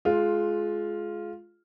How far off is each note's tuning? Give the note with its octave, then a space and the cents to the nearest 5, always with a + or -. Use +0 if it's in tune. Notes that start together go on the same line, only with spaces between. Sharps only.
G#3 +25 F4 +0